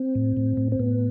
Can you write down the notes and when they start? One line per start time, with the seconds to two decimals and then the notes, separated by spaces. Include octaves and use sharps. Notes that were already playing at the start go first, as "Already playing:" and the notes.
Already playing: C4
0.15 A2
0.37 A2
0.57 A2
0.72 C4
0.79 A2 B3